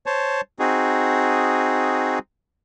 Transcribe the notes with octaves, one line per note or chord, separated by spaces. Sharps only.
C5 C#5 A5
C4 D#4 F#4 G#4